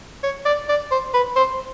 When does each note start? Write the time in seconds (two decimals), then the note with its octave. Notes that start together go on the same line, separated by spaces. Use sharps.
0.23 C#5
0.46 D5
0.69 D5
0.91 C5
1.14 B4
1.36 C5